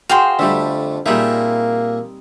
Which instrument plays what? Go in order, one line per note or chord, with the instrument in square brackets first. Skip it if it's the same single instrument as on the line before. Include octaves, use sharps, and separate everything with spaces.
[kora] F#4 G#4 C5 [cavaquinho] F5 G5 C6
[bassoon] F2 [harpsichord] D3 A3 [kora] G3 E5
[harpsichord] A#2 G#4 E5 [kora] G3 C4 D#4 [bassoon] A#3